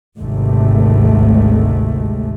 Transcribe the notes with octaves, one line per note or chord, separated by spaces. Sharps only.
G#1 D2 C3 G#3 A3